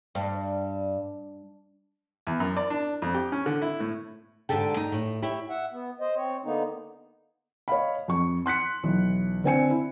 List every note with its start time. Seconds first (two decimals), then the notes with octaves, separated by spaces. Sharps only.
0.15 G2
2.27 E2
2.40 F#2
2.57 D5
2.70 D4
3.02 F2
3.15 G4
3.32 C#4
3.46 D3
3.62 E4
3.80 A2
4.49 G#2 D3 G4 A4 G5
4.77 D#4
4.92 A2
5.22 E4 G4 C#5
5.49 E5 F#5
5.72 B3
6.00 C5 D#5
6.16 C4 C#5
6.44 D3 A#3 B3 D#4
7.68 C#5 D#5 F5 B5
8.08 F2 C#6
8.46 C6 F#6 B6 C#7
8.83 B1 E3
9.44 D3 C4 G#5 C#7
9.70 E4